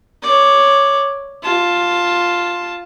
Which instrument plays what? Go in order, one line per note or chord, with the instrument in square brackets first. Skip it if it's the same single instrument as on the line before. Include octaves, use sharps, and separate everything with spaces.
[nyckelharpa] C#5 D5
F4 A5